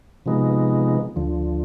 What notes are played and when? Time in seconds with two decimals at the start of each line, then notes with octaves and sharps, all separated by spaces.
0.26 C3 F3 G#3 B3 D#4
1.16 D2 D3 F3